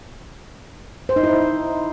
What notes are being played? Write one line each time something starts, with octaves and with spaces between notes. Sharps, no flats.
C5
D#4
E4